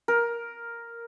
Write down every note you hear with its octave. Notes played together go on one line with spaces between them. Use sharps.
A#4